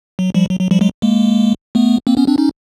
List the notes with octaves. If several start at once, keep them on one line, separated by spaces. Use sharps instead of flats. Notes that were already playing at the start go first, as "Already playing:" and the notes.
F#3
F3 G3
F#3
F#3
F3 G3
F#3 G#3
G#3 A#3
A3 B3
A#3 C4
B3 C#4
C4 D4
C#4 D#4